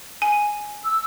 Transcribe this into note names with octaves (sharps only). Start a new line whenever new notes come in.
G#5
E6